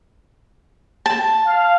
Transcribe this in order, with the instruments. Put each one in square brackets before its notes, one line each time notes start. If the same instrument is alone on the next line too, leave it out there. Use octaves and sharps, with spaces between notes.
[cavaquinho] A5
[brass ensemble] F5